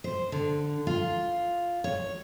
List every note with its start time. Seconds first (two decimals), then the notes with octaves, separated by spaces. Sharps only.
0.04 C5
0.32 D3
0.87 F4
1.84 C#5